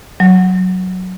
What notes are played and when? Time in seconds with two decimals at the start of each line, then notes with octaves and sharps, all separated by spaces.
0.20 F#3